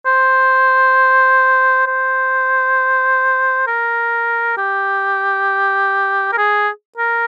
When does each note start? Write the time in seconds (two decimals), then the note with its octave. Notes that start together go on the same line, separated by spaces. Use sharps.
0.06 C5
1.86 C5
3.67 A#4
4.57 G4
6.32 A#4
6.37 G#4
6.97 A#4